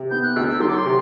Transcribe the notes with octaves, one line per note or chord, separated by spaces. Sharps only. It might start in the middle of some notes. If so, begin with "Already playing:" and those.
Already playing: C3
B3 G6
F#6
D2 E6
E6
F#3 C6
D6
C6
C3